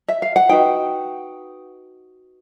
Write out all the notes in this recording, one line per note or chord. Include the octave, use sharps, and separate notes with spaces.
E5
F5
F#5
D#4 F#4 B4 G5